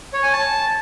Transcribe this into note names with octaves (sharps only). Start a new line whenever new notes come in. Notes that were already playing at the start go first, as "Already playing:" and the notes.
C#5
G#5
A5